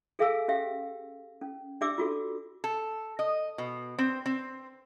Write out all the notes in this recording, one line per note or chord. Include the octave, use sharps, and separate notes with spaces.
G#4 A4 E5 F5 G#5 E6
C#4 G4 E5 F5
C#4
D4 G4 D5 E5 D6 E6
F4 F#4 A4
A4
D#5
B2
C4
C4